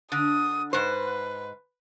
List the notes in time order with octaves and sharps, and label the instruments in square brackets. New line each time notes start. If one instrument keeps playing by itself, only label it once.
[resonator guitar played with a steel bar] D3 [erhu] D#6
[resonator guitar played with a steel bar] G#2 C5 [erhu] B4